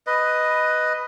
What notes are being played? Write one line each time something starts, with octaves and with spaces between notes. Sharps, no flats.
B4 D#5